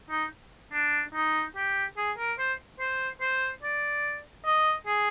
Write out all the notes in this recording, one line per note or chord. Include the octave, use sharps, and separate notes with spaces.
D#4
D4
D#4
G4
G#4
A#4
C5
C5
C5
D5
D#5
G#4